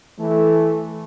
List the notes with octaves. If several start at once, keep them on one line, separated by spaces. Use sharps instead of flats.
E3 A3